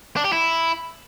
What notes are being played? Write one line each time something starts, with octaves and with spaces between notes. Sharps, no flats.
D4
G4
E4